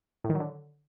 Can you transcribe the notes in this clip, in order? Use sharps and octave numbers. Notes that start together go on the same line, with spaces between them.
A2
D#3
F#3
D3